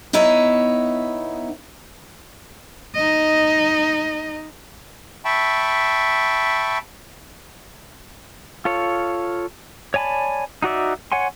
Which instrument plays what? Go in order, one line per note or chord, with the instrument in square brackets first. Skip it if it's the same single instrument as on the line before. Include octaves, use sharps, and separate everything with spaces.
[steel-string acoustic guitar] B3 D#4 E4 C#5 E5
[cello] D#4 D#5
[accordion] E5 G5 A5 B5 C#6
[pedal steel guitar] F4 A4 C#5
C#5 D5 G#5 A5 B5
D#4 F#4 D5 E5
C#5 F#5 G#5 C6